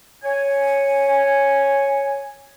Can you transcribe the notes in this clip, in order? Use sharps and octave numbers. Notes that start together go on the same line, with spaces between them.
C#5 G#5